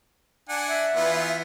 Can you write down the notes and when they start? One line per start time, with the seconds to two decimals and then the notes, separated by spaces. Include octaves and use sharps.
0.49 D4 F#5 G#5
0.68 E5
0.96 E3 B3 F4